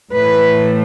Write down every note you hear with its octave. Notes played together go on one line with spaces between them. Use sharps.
A2 E3 A3 B4